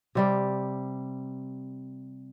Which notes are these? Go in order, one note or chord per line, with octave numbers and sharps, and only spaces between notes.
C3 G3 D5